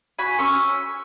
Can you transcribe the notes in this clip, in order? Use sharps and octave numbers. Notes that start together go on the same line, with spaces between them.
F#4 G#5 B5
C#4 C#6 E6